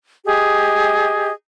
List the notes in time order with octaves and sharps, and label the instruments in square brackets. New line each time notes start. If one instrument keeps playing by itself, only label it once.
[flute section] G4 G#4 D#5